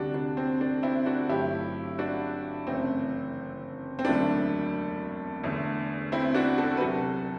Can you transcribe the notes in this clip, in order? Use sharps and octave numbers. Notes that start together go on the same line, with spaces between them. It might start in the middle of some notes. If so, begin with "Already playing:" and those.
Already playing: D2 C3 G3 D4 F#4
D4
C4
D4
C4 E4
D4 F#4
G1 G2 F#3 A3 E4 G4
D4 F#4
F#1 F#2 E3 A3 C4
C4
E1 D2 D3 F#3 A3 D4
E2 D3 A3
C4 E4
D4 F#4
F#4 A4
B4
C2 C3 F#3 F#4 A4